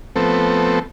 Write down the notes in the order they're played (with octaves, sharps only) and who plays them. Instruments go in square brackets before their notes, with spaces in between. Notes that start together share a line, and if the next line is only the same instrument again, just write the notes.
[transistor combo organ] F3 A3 B3 C4 A4